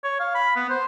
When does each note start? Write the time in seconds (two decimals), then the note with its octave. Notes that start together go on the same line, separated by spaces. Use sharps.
0.04 C#5
0.20 F5
0.35 B5
0.56 B3
0.69 C5